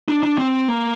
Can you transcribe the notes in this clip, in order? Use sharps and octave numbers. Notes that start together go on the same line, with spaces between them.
D4
D4
C4
A#3